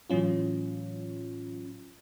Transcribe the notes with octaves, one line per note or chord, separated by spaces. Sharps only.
A2 E3 F#3 C#4 F4